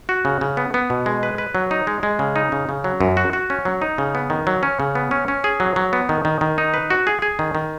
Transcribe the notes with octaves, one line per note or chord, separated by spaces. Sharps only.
F#4
C#3
C#3
B3
B3
B2
G#3
B4
B4
F#3
D#4
G#3
G#3
C#3
D#4
C#3
C#3
F#3
F#2
F#4
F#4
C#4
F#3
D#4
C#3
B3
D#3
F#3
C#4
C#3
B3
C#4
C#4
G#4
F#3
F#3
B3
D#3
D#3
D#3
D#4
B4
F#4
G#4
G#4
D#3
D#3